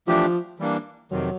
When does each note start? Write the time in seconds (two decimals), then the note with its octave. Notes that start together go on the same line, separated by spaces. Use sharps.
0.07 E3 F3 A3 D4 G4
0.59 E3 G3 A#3 D4
1.11 F2 C3 D#3 F#3